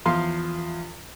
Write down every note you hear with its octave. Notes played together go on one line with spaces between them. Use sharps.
E2 F3 F5 C6